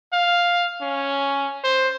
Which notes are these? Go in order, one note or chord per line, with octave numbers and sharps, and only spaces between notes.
F5
C#4
C5